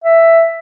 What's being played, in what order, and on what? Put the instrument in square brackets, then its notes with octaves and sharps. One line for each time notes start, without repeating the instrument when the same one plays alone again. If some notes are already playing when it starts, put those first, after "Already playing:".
[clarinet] E5